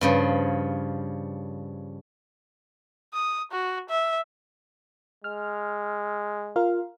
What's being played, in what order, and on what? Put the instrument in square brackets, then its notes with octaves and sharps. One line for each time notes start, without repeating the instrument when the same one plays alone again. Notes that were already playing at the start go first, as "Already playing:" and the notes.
[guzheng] G2 C#3 F3
[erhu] D#6
F#4
E5
[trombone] G#3 [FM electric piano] F6
[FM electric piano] F4 A#4 F5